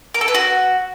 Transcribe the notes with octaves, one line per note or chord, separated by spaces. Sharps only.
A#4
A4
B4
F#4